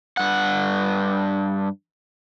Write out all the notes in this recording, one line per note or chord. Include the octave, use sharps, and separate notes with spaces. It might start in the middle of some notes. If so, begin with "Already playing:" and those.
G2 F#5